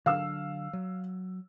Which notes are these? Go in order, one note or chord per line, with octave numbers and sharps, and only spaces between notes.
D3 F#3 D4 F5 E6
F#3